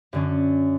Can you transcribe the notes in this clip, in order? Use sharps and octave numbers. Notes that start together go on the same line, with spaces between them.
F#2 D3 F#3 C#4